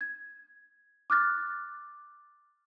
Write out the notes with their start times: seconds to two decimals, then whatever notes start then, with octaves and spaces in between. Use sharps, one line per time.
0.01 G#6
1.10 D6 F6 F#6 A6